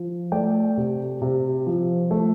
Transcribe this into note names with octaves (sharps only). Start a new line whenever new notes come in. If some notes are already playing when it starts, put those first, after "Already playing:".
Already playing: F3
A3 D5 G5
C3
C3
F3
A3